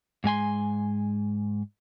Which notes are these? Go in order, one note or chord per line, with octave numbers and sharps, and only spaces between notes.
G#2 G#3 G#5 C6